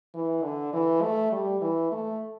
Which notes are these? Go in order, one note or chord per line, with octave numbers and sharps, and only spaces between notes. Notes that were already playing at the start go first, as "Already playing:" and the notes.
E3
D3
E3
A3
G3
E3
A3